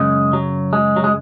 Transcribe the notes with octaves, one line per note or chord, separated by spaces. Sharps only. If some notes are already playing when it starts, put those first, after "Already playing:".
Already playing: F#2 C#3 G#3
F#3
G#3
F#3
G#3